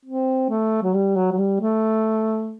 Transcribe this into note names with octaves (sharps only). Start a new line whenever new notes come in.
C4
A3
F#3
G3
F#3
F#3
G3
A3